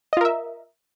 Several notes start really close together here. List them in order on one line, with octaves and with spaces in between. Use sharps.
D#5 F4 A#4 E5